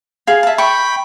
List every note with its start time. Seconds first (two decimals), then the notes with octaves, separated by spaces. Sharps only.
0.27 G#4 F5
0.43 E5 A5
0.58 G5 B5 C#6